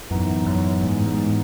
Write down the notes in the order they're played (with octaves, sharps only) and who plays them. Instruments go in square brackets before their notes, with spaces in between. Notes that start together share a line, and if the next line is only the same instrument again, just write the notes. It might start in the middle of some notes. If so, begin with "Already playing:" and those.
[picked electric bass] F#2 [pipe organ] A2 E3 B3 D#4
[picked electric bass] F#2
G#2
G#2